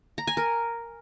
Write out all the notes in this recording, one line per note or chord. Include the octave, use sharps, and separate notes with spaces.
A#5
G#5
A#4